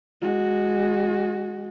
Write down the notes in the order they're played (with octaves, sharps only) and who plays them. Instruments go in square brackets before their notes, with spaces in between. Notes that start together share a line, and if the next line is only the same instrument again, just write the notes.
[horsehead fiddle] G#3 F#4